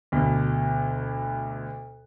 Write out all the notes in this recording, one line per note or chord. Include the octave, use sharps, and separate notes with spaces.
D2 B2